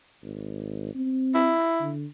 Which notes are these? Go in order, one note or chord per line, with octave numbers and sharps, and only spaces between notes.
G#1
C4
E4
D3